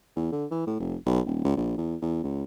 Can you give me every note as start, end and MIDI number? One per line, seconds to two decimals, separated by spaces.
0.16 0.29 40
0.32 0.45 50
0.51 0.66 52
0.67 0.76 45
0.80 0.96 29
1.06 1.20 35
1.26 1.44 27
1.44 1.55 37
1.57 1.76 34
1.78 1.96 40
2.02 2.21 40
2.23 2.43 37